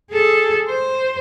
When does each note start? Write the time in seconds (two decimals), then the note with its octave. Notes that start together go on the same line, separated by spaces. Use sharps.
0.11 G#4 A4
0.68 C5